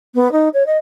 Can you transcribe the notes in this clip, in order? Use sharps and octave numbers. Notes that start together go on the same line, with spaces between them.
B3
D#4
C#5
D#5